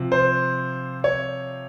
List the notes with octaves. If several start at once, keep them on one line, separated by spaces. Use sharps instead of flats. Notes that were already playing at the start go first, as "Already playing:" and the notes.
Already playing: C3 F3
C5
C#5